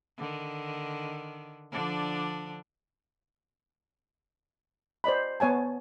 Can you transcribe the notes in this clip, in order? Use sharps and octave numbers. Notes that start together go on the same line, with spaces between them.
D3 D#3
D3 F3 D4
C5 D5 D#5 B5
B3 C#5 G#5 A5